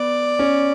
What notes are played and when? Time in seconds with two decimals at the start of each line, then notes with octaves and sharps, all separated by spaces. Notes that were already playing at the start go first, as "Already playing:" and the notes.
Already playing: B3 D5
0.39 C#4